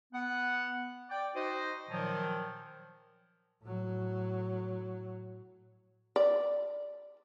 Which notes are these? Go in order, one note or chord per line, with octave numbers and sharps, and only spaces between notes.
B3 F#5
D5 G5
D#4 F#4 C5 D#5
A#2 D#3 F3 F#3
A2 F#3
D5